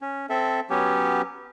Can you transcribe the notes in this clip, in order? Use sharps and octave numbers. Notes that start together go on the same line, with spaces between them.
C#4
C4 A4 E5
F#3 B3 C#4 G4